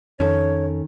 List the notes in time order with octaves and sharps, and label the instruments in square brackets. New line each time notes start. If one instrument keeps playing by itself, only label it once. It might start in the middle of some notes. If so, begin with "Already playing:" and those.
[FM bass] F2 [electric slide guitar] D#3 [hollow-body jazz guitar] C#4 A4 [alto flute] C#5